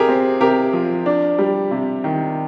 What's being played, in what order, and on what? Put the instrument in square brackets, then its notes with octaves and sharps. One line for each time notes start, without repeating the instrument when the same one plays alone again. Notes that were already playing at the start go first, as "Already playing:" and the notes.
Already playing: [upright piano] C3 G4 G#4 A#4
C4
C3 G4 A#4
F3
D4
G3
C3
D#3